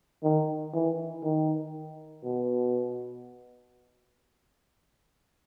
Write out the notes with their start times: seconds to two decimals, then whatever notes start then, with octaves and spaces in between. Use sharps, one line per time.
0.23 D#3
0.74 E3
1.23 D#3
2.24 B2